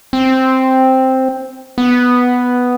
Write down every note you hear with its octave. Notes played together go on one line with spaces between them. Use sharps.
C4
B3